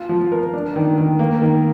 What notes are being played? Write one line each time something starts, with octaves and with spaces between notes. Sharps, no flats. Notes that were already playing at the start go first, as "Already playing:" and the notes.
Already playing: F4
F3
A#4
D4
D#3
D#3
A#3
D#3